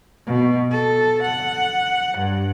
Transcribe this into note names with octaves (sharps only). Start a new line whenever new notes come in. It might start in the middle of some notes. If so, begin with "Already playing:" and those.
B2
A4
F#5
G2